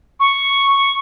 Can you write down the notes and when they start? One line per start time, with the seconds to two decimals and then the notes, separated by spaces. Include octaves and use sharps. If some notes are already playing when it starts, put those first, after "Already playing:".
0.20 C#6